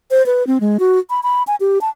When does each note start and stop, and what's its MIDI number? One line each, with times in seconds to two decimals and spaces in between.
0.11 0.25 72
0.26 0.45 71
0.47 0.58 60
0.60 0.77 56
0.79 0.99 66
1.10 1.23 83
1.23 1.43 83
1.47 1.56 80
1.60 1.81 67
1.81 1.90 81